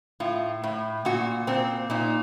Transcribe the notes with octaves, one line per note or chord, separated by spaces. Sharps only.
A2 F4
A2
A#2 F#4
A#2 C4
A#2 D#4